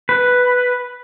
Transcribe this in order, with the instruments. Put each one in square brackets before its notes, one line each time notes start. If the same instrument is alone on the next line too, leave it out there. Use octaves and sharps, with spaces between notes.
[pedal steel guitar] B4